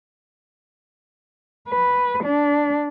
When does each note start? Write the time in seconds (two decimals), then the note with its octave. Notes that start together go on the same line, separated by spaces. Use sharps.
1.69 B4
2.24 D4